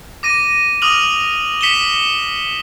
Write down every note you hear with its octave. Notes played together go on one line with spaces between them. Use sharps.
D6 A#6 D#7
D6 D#6 F6 F7 F#7
B6 C#7 E7 F#7 G7